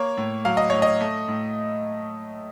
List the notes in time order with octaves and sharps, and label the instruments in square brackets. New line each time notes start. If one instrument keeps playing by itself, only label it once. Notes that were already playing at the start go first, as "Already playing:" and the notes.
Already playing: [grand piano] A#3 C#5
A2
F#3 F5
D#5
A2 C#5
D#5
A3
A2